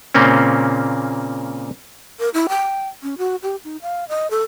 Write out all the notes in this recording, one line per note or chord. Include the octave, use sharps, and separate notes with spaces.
A#2 C#3 A#3 C4 C#4
A#4
E4
G5
C#4
F#4
G4
D#4
F5
D#5
A4